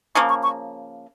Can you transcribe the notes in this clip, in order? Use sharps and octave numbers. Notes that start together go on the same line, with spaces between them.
C#3 F3 A#3 C#6
C#6
C#6